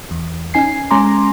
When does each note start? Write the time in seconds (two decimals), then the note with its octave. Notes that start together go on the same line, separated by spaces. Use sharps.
0.11 E2
0.54 C#4 D#4 G#5 C7
0.91 G#3 C#4 G#5 A#5 C6 D6